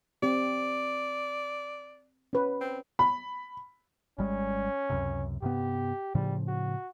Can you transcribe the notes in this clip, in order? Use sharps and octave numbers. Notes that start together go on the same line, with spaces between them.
C4 G4 D5
C#4 B4
C4
B5
G#1 G3 G#3 C#4
C#2 F#2 C3
G2 C3 B3 G4
A2 C#3 F3 G3
F#4